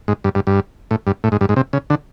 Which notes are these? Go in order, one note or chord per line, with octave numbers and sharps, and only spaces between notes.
G#2
G2
G2
G2
A2
G2
A2
G#2
G2
G#2
C3
C#3
D3